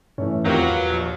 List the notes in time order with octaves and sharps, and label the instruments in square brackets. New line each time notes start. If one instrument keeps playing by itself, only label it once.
[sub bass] G2 [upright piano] E3 A3 C#4
[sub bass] E2 [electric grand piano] D#3 C4 A#4 [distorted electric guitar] F#3 [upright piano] F4 G4
[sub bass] E2 [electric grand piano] B4 F5
[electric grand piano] A#1